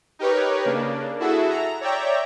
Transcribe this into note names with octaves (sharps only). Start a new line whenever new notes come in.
D#4 G4 A#4 B4 C#5
C#3 A#3 D4
E4 F#4 G#4 A4 E5
A#5
C#5 D5 E5 G5 A#5